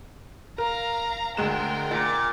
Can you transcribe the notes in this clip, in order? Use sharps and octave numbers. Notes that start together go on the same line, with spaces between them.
A#4 F5 A#5
D2 G#3 A#4 G5 E7
A#2